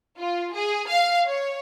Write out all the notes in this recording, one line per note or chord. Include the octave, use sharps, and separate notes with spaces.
F4
G#4
F5
C#5